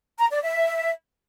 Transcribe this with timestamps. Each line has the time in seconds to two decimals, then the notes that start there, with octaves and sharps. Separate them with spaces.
0.19 A#5
0.30 D5
0.42 E5